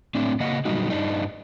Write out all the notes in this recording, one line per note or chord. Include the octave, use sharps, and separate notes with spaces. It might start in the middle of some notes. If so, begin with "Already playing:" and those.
A2 C4 D4
C#3 A#3 D#5 F#5
A#2 D3 F#3 G3 D#4 F#4
G2 D4 D#4